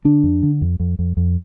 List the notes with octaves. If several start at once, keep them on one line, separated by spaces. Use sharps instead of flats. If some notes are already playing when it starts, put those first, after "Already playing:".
D3 D4
F2
D3
F2
F2
F2
F2